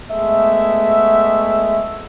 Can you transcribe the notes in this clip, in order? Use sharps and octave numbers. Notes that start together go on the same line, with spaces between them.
G#3 A3 B3 E5